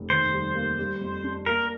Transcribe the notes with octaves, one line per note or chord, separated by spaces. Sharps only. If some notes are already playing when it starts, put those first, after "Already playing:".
Already playing: F1
D#2 C5
G3
A#3
G3
F2
D4
A#3 A#4